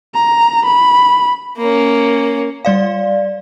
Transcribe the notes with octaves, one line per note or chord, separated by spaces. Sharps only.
A#5
B5
A#3 C#4
G3 D5 F5